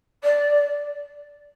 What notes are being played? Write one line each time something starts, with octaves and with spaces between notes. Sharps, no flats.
D5